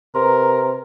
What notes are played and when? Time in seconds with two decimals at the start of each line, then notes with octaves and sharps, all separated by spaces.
0.15 C3 A#4 B4 A#5 C6